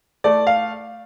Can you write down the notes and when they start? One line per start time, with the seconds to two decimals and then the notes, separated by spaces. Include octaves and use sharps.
0.24 A3 D5
0.47 F5